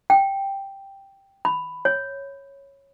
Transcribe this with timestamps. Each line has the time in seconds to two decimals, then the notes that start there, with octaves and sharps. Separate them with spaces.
0.10 G5
1.45 B5
1.85 C#5